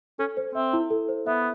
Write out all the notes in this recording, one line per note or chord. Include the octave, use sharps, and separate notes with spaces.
C#4 A4
C5
C4 E5
E4
A4
C5
B3 E5